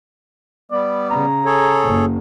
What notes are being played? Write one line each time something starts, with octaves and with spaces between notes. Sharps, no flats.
G3 B3 D5
C#3 A#5
G#4 A4 C#5
F#1